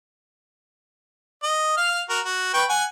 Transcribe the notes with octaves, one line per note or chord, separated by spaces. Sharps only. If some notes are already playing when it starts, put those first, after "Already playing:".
D#5
F5 F6
F#4 A#4
F#4
B4 G5 C#6
F#5 G#5